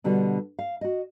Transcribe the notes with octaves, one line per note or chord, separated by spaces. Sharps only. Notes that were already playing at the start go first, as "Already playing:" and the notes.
B2 D3 G3 B3 F#4
F5
F#4 D#5